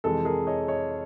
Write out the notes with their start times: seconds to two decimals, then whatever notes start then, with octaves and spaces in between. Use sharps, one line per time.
0.04 F2 C3 E3 G#3 A4
0.25 G#4 A#4
0.47 C#5 D#5
0.68 C#5 D#5